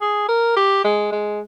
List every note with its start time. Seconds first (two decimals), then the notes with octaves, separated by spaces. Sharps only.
0.01 G#4
0.28 A#4
0.56 G4
0.84 G#3
1.12 G#3